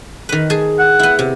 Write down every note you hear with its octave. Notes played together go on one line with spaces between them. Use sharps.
D#3 B4
G#4 G#5 A5
F#5
B3 E4
C3